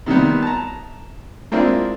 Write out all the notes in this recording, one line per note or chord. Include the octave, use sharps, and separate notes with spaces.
C3 D#3 G3 B3
A5 A#5
G#3 A#3 C4 D4 E4 F4